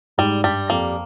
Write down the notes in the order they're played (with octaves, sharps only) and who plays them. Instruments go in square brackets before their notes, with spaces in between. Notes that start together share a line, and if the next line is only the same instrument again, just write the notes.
[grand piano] G#2 [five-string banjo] G3
[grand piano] G2 [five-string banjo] G3
[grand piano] F2 [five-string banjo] A#3